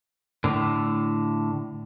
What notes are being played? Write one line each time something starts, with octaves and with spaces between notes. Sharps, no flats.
A2 D3